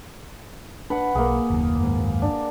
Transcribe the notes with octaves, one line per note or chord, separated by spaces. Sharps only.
D4 B4 F#5
B1 A#3 G#4
F#1 D#2
F#1 D#2 G#2
D4